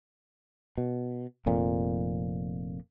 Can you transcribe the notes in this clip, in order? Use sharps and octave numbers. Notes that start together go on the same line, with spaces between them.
B2
F1 F2 A#2